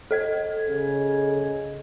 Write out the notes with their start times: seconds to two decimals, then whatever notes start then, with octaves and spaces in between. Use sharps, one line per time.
0.11 A4 D#5 G#6
0.68 C#3